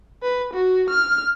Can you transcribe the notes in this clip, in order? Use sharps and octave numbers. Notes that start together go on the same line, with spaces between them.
B4
F#4
F6